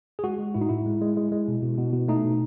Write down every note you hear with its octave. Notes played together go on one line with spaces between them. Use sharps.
G#4
G#3 F#4
G#3
A2 E4
D#4
A2 E4
G#3
G#3
G#3
G#3
B2
B2
B2
B2
A3 D#4
B2